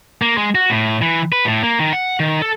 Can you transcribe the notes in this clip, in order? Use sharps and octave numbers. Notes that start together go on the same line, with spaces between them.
A#3
G#3
F#4
A2
E3
B4
A2
A#3
D#3
F#5
D#3
A4